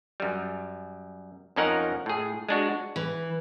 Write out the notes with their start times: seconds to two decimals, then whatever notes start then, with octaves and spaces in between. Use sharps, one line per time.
0.20 F#2 G3
1.56 F2 F3 C#4 D#4 A#4 F#5
2.06 A2 G#4
2.49 G#3 D4 F#4
2.96 E3